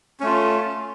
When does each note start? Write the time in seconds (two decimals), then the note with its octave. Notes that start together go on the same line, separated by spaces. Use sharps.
0.20 C#4
0.23 A3
0.26 F4